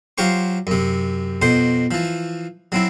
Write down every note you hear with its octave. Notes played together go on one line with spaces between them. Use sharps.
F#3 F4 G4 C5 C#6
F#2 C3
F2 B2 C5 C6
E3 F3
F#3 C4 E4